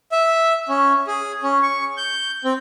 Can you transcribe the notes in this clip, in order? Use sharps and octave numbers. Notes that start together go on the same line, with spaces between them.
E5
C#4
G#4
C#4
C#6
G6
C4